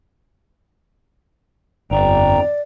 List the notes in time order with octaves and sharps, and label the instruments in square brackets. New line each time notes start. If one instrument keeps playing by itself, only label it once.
[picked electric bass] G1 [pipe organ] F2 G5 A#5 [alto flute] D5